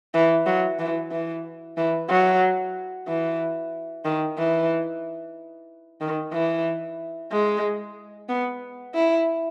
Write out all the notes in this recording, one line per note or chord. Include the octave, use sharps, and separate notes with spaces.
E3
F#3
E3
E3
E3
F#3
E3
D#3
E3
D#3
E3
G#3
B3
E4